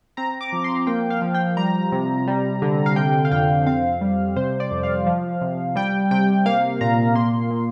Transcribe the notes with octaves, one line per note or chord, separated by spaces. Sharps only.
C4 A#5
D6
F3
D6
C6
A#3 G5
F5
F3
G5
G3 A#5
C3
G3
D3
F5
C3 G5
F5
F2 G5
C4 F5
G3
C3 C5
D5
F2
F5
F3
C3
G3 G5
C3 G5
A#3 F5
A#2 A#5
A#3 C6
A#2